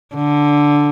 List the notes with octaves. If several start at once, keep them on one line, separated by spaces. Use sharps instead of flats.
D3